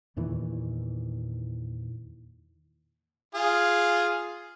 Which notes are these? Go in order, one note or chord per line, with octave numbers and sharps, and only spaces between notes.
E2 A#2 D#3 E3
F4 G#4